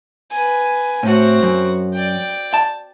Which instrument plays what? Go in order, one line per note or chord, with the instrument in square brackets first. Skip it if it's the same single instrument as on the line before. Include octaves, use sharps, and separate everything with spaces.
[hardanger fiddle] B4 G#5
[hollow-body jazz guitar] A2 [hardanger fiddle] C4 F#4
[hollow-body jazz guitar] F#2
[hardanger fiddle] D5 G5
[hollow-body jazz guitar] A5